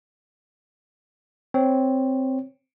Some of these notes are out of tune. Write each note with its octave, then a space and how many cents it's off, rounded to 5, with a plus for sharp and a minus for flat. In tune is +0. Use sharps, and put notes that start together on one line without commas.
C4 +0 C#5 +0